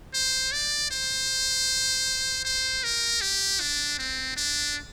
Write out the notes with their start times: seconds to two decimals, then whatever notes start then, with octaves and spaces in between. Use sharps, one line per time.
0.14 C5
0.52 D5
0.91 C5
2.45 C5
2.83 A#4
3.21 G4
3.60 D4
3.99 C4
4.36 D4